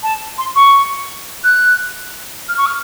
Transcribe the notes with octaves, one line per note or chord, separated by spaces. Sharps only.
A5
C6
C#6
F#6
F6
C#6
F6